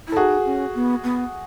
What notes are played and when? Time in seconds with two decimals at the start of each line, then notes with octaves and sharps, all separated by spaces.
0.07 E4
0.12 A4
0.17 D#4 F#4 G#4
0.45 C#4
0.75 B3
1.03 B3